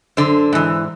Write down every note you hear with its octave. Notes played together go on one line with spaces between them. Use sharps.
F#2 D3 C5
G#2 E3